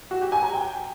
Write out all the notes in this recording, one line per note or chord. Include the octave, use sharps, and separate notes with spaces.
F#4
G4
G#5
A#5
G5